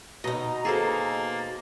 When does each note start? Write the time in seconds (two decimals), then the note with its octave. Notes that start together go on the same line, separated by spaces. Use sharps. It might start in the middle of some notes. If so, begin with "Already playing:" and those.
0.24 B2 D#4 D#5 A#5
0.65 A#3 G#4 A4 C5 A6